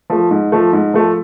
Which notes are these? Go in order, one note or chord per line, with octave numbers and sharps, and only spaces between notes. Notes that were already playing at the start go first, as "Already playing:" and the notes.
F3 A3
G#2
F3 A3
G#2
F3 A3